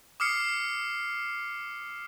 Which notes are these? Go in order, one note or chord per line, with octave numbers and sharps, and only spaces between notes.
D6 D#6 F6 C7 C#7